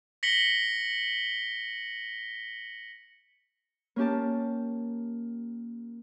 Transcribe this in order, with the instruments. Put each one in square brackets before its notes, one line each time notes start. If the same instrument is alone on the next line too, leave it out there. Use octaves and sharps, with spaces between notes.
[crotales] A#6 B6 C#7 F#7 G7
[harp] A#3 C#4 G4 A5